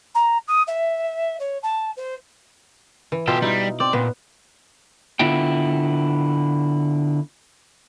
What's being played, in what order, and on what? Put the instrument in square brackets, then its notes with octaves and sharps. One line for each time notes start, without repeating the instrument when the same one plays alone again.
[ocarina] A#5
D#6
E5
C#5
A5
C5
[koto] E3
[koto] B2 F4 C5 [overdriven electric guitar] G4 A4
[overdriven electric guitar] G3 [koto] D#4 E4 F5
[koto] C4 [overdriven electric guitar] D5
[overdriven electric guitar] A#2 [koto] B3
[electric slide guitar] D3 B3 E4 F4 G5